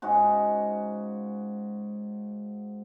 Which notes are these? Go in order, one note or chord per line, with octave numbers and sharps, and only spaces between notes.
G#2 C#3 F#4